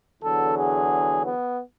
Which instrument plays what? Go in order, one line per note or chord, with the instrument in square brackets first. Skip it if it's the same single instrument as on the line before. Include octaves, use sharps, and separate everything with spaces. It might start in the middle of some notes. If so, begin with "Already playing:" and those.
[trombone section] E2 D3 F#3 A4
G#4
B3